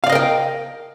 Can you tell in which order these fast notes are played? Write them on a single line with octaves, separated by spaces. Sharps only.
F5 D5 D#5 A#4 G5